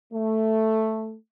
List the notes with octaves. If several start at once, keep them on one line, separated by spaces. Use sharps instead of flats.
A3